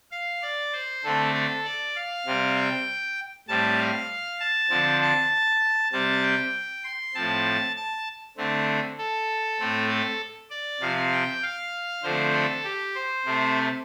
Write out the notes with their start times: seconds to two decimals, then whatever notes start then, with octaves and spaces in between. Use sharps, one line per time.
0.11 F5
0.42 D5
0.73 C5
1.04 D3 A3 C4 A4
1.35 A4
1.65 D5
1.96 F5
2.26 C3 G3 C4
2.56 G5
3.48 A2 G3 C4 A5
3.78 F5
4.40 A5
4.70 D3 F3 C4
5.01 A5
5.92 C3 G3 C4 A5
6.23 G5
6.84 C6
7.14 A2 F3 C4 A5
7.76 A5
8.37 D3 A3 C4
8.99 A4
9.60 A2 A3 C4
9.89 A4
10.50 D5
10.81 C3 F3 C4 F5
11.12 G5
11.43 F5
12.03 D3 F3 A3 C4 C5
12.34 A4
12.64 G4
12.95 C5
13.26 C3 A3 C4